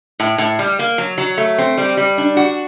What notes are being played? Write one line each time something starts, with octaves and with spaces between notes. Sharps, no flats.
A2
A2
G3
A#3
F#3
F#3
A3
C4
G3
G3
D4
F#4